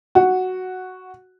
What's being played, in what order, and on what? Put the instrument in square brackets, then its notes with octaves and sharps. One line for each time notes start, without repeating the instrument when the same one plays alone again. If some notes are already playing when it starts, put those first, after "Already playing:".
[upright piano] F#4